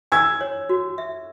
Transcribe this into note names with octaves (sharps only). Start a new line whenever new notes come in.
G#5 E6 G#6
C#5
F#4
E5